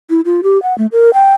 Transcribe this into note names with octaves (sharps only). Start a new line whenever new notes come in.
E4
F4
G4
F#5
A3
A#4
G5